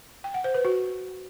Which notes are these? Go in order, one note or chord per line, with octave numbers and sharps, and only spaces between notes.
G5
F#5
C5
B4
F#4